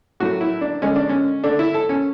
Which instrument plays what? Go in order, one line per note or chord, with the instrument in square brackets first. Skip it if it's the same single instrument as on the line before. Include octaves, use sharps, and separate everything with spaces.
[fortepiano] A2 F#3 A3 F#4
E4
D4
D3 G#3 C#4
D4
C#4
D3 A3 D4
E4
A4
C#4